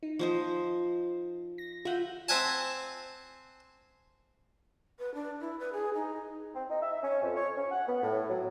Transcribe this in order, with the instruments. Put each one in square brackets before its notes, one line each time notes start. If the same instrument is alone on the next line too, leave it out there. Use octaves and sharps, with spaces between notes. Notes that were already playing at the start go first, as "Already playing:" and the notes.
[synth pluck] D#4
[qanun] F3 C5 D#5
[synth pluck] A#6
[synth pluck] F4 G6 D#7 [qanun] E5 F#5
[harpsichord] C4 E5 F#5 G#5 A5
[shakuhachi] B4
D4
E4
B4
G#4
D#4
[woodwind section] C4
D#4
E5
C#4
F2
C#5
C#4
F#5
B3
A2
F#3